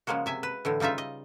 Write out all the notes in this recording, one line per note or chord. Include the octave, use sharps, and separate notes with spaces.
C#3 F3 G#3 A#3 F#4
C3 E5 G#5
B4
A2 D3 E3
C#3 G3 D#4 F4 E5
D#5